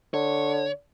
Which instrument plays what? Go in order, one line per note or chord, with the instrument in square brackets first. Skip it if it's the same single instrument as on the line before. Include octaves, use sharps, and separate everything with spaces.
[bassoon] D3 [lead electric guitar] C#5